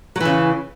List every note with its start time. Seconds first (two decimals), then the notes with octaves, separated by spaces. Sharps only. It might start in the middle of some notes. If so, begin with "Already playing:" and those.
0.16 F#3
0.21 E3
0.25 C#3